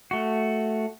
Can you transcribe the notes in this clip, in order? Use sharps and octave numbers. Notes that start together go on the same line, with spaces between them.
A3 F#4